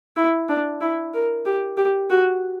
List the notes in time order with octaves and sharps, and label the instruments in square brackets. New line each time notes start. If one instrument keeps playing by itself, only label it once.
[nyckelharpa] E4
D4
E4
A#4
G4
G4
F#4